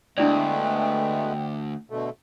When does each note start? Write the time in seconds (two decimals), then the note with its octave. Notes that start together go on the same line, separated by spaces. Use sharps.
0.18 D2 G#3 A3 B3 D4 E4 D5 G5
1.90 B2 D3 A3 A4